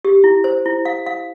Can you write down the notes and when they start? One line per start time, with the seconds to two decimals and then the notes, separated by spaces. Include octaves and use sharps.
0.05 G4
0.24 E4
0.44 C5
0.66 E4
0.85 F5
1.06 F5